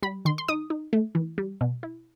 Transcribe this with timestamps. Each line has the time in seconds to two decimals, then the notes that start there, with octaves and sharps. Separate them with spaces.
0.02 G3 B5
0.25 D#3 C6
0.38 C6
0.48 D#4 D#6
0.70 D#4
0.93 A3
1.15 E3
1.38 G3
1.61 B2
1.83 E4